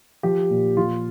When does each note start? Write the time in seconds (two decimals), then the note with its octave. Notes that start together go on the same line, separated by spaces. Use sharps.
0.23 F3 G4
0.50 A#2
0.77 F3 F4